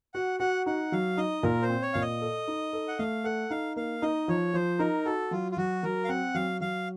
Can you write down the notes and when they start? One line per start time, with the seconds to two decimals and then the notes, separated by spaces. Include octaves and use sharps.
0.14 F#4 F#5
0.40 F#4 F#5
0.66 D#4 F#5
0.92 F#3 F5
1.17 D#4 D#5
1.43 A#2 A#4
1.62 C5
1.69 C4
1.82 C#5
1.93 A#2 F5
2.01 D#5
2.21 A4
2.48 D#4
2.73 A4
2.88 F#5
2.99 A3 F5
3.24 A4 F#5
3.50 D#4 F5
3.76 A#3 F5
4.02 D#4 D#5
4.28 F3 C#5
4.54 F3 C5
4.79 D#4 A#4
5.05 F#4 A4
5.31 F#3 F4
5.52 F4
5.57 F#3 F#4
5.83 F#3 A#4
6.04 F5
6.09 C4 F#5
6.34 F#3 F5
6.61 F#3 F5